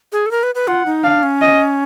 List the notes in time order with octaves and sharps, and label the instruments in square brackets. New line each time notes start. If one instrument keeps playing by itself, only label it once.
[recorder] G#4
A4
A#4
B4
B4
[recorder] F4 [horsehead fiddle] F#5
[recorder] D#4
[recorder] D4 [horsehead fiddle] F5
[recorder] C#4
[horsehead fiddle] D#5